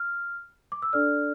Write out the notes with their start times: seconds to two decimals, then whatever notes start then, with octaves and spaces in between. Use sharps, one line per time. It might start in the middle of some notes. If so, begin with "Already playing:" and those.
Already playing: F6
0.72 D6
0.82 E6
0.93 D4 A4 D5 F6